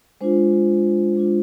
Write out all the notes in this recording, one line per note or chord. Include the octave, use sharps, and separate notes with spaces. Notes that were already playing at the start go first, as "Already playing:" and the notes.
G#3 D4 F4 C5
G#3 D4 F4